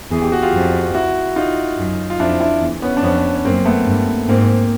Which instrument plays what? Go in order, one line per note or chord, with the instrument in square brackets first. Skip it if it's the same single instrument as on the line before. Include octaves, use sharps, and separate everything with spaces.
[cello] E2 [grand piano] G#4
[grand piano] G4
F#4
F4 G4
[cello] F2
[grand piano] E4 F#4
D#4 F4
[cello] F#2
[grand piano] F4
[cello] F2 [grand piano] D4 E4
[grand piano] D4 E4
[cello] E2
[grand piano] B3 C#4
D4
[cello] F2 [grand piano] B3 C#4
[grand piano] C#4
[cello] F#2 [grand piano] A#3 C4
[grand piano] A3 B3
[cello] G2
[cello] G#2 [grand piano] A#3 C4